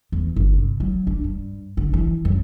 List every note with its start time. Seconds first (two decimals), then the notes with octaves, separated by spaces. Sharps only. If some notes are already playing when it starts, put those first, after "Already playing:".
0.12 E2
0.36 G1
0.53 C3
0.80 F#3
1.07 D4
1.24 G2
1.77 D3
1.93 E3
2.25 F#2